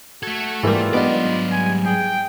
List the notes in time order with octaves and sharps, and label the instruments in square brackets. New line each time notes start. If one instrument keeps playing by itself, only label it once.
[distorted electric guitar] A3 A4 [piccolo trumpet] F#4 [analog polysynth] G#6
[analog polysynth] G#2 G3 [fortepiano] E3 A#3 [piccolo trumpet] F4
[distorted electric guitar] F#3 D5 [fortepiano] B3 D4 D#4
[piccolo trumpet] G#5
[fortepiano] G#4 [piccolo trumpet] G5